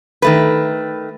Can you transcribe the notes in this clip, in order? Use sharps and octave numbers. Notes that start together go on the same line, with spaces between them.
D#3 A3 B4